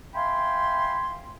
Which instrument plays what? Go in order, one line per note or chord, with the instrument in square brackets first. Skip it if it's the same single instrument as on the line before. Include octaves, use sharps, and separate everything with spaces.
[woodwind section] E5 F5 G5 G#5 B5 C6